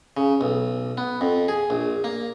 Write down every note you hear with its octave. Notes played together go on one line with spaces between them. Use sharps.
C#3
B1
B3
F2
G#4
A#1
A#3